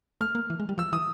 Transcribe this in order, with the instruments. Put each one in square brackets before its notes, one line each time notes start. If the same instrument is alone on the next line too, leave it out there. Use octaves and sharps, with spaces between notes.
[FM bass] A3 [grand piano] F6
[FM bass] A#3
E3
G#3
G3
[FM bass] F3 [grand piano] E6
[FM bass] E3 [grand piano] D#6